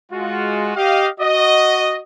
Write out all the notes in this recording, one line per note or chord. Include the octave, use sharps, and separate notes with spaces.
G#3 F4 F#4
G4 D#5 F5
F#4 D#5